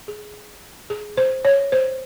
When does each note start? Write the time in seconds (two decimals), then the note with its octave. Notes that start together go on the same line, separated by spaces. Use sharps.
0.08 G#4
0.90 G#4
1.17 C5
1.45 C#5
1.72 C5